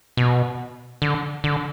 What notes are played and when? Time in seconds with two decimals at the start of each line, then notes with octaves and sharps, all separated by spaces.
0.17 B2
1.02 D3
1.44 D3